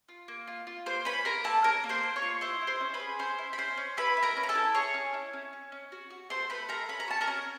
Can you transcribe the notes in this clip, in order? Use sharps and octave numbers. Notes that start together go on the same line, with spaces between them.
F4
A#3
F4
F4
A#3 C5 C6
C#4 B4 B5
A#3 A#4 A#5
A#3 A4 A5
C#4 A#4 A#5
A#3
C5 C6
A#3
C#5 C#6
F4
E4 C5 C6
E4
C5 C6
C#4
B4 B5
G#4
C#4 C5 C6
E4
B5
C#4 C5 C6
C#4
E4 B4 B5
E4
A#4 A#5
C#4
A#5
A4 A5
E4
G#4 C#5 C#6
C#4
E4
C#4
C#4
C#4
F#4
F#4
A4 C5 C6
A3 B4 B5
A4 A#4 A#5
C#4 B5
A#5
F#4 A5
A#4 A#5
C#4